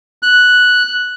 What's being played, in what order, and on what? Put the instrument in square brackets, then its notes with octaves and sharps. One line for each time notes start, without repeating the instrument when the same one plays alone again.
[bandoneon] F#6